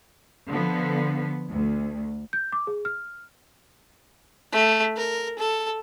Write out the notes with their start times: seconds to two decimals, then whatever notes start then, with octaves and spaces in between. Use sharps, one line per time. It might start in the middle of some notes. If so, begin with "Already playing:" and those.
0.48 D3 F3 B3
1.50 D2
2.33 G6
2.52 D6
2.67 G#4
2.85 F6
4.52 A3
4.96 A#4
5.38 A4